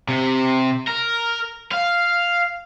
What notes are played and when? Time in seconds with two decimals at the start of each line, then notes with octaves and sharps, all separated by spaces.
0.08 C3
0.88 A#4
1.72 F5